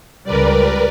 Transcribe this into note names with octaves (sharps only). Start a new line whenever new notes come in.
C#2 G3 A#4 B4 D5